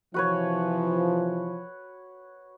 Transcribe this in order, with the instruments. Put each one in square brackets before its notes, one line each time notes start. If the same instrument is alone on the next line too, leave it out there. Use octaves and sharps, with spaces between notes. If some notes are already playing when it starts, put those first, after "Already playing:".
[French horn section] C3 E3 F3 [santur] F#4 B4 C#5